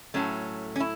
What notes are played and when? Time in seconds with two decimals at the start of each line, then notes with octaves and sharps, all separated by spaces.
0.14 A2 F#3 A3 C#4
0.76 C#4
0.80 E4